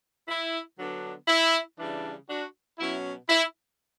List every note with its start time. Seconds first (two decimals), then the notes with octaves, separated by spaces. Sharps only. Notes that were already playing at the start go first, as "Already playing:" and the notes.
0.28 E4
0.78 D3 F#3 B3 D4
1.28 E4
1.78 C#3 E3 G3 D4
2.28 D4 F#4
2.78 B2 F#3 C#4 E4
3.28 E4